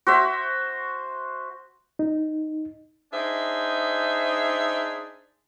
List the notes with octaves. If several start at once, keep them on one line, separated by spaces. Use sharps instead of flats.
F#4 C5 E5
D#4
D4 D#4 G#4 C5 E5